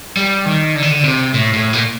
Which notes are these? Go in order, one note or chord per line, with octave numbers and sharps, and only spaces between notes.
G3
D#3
D3
D#3
D3
C3
A2
A2
A#2